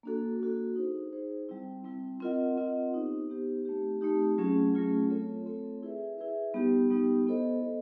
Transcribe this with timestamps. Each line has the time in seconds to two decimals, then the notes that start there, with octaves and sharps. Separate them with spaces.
0.03 A#3 D4 F#4 A4
0.40 A#3 D4 F#4 A4
0.76 D#4 G#4 C5
1.12 D#4 G#4 C5
1.49 G3 C4 E4
1.84 G3 C4 E4
2.20 C4 F4 A#4 D#5 F#5
2.57 C4 F4 A#4 D#5 F#5
2.93 B3 D#4 G4 C5
3.29 B3 D#4 G4 C5
3.65 A3 C4 D#4 G4
4.01 A3 C4 D#4 G4
4.38 F#3 A3 C#4 F4 G#4
4.74 F#3 A3 C#4 F4 G#4
5.09 A3 C4 F4 A4 C#5
5.46 A3 C4 F4 A4 C#5
5.83 E4 G#4 B4 E5
6.18 E4 G#4 B4 E5
6.54 G3 B3 D#4 G4
6.90 G3 B3 D#4 G4
7.27 B3 E4 A4 C5 D#5
7.63 B3 E4 A4 C5 D#5